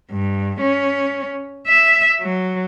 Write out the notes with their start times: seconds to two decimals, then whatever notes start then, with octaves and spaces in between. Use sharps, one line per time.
0.11 G2
0.61 C#4
1.67 E5
2.21 F#3